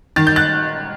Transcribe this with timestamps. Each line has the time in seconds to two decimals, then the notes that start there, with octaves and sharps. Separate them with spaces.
0.16 D#3 A6
0.27 G6
0.36 F#6 A6